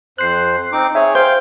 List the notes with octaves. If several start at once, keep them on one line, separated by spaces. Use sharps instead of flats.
F2 C5 F#6 C7
C4 D#4 D6
G#4 C#5 E5 G#5
C5 F5 G5 G6